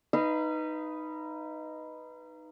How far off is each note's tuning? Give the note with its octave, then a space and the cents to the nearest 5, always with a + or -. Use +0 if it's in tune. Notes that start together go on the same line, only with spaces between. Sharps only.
D#4 +0 B4 +0 F5 -40